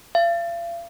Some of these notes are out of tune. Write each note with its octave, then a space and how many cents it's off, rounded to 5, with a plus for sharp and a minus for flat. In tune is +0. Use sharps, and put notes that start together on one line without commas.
F5 -40